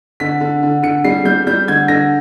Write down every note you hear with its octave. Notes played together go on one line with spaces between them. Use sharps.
D3 B6
D3
D3
D3 C#7
G3 C7
G3 G6
G3 G6
D3 G#6
D3 A#6